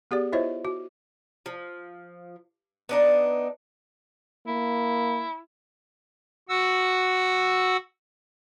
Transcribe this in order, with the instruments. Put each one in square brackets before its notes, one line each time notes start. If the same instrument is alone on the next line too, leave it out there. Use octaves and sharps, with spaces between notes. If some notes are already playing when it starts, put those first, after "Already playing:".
[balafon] B3 G4 G#4 D5
E4 F4 C5 C#5 D#5 E5
F#4
[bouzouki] F3
B3 D4 D#4
[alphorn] A#3 [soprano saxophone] E4
[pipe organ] F#4 F#5 E6